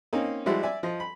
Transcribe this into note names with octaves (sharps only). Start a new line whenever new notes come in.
A#3 C4 C#4 D#4
F3 G3 G#3 E4 F#4
D5 E5 G#5
F3 D#5
B5